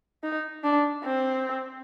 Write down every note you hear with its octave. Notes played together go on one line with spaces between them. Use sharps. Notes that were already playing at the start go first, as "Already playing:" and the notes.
D#4
D4
C4